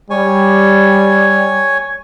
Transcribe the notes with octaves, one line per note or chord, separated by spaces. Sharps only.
G3 C#5 G#5